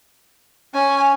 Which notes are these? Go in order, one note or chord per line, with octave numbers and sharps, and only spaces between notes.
C#4 G#5